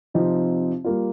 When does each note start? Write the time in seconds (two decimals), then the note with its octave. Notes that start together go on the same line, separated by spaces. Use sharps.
0.14 C3 F3 C4 D#4 G4
0.84 G3 A#3 F4